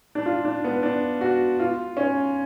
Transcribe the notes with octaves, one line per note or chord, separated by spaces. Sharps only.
D4
F4
D4
B3
D4
F#4
F4
C#4